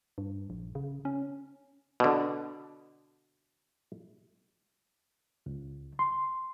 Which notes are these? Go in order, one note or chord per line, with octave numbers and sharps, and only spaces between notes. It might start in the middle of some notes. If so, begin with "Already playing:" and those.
G2
A#1
C#3
C#4
B2 D3
C#2
C6